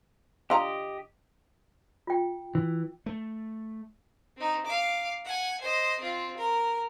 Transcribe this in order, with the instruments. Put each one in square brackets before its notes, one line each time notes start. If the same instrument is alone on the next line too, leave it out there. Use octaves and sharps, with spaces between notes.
[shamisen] D3 F4 A#5 [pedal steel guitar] G4 D#5
[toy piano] F4 G5
[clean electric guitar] E3
[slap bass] A3
[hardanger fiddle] C4 D#4
F5 D6
F#5 G#5
C5 D#5
C4 F4
A#4